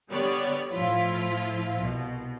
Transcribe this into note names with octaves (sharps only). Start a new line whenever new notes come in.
D3 G3 B3 C#5 D5
A2 F3 E4 F4 B6
C2 B2